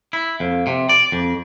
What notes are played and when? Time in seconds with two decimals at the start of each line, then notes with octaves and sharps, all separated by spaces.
0.13 E4
0.40 F2
0.67 C3
0.89 D5
1.12 F2